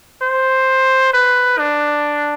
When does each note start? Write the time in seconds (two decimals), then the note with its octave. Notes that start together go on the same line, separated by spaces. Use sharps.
0.22 C5
1.13 B4
1.58 D4